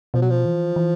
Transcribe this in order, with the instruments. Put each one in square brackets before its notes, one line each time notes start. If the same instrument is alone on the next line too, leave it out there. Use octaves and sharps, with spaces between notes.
[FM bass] B2 [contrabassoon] F3
[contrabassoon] F#3
F3
[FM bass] E3
E3